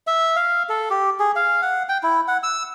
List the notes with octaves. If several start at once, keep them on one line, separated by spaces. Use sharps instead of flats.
E5
F5
A4
G4
G#4
F5
F#5
G5
E4
F#5
E6